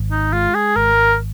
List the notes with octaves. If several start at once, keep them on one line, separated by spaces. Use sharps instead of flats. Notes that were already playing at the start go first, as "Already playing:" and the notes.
Already playing: G#1
D#4
G#3 F4
G#4
G#1 A#4